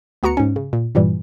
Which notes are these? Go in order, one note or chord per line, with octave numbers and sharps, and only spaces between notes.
D2 B3 F#4 A#5 C#7
G#2 C#4
C#3
A#2
G2 A#2 E3 G3